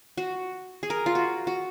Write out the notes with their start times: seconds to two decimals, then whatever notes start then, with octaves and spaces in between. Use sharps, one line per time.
0.17 F#4
0.83 G#4
0.90 A#4
1.06 F4
1.15 F#4
1.47 F#4